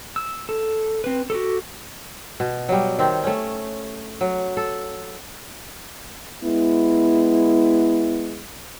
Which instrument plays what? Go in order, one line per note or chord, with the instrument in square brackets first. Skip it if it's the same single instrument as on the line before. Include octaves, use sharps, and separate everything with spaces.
[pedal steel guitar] E6
A4
C4 B4
F#4 G4 A4
[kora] B2
F#3 G3
D#3 C4
A3 C#4
F#3
A4
[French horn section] G#3 B3 E4